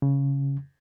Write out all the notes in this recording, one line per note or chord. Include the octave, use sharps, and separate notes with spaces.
C#3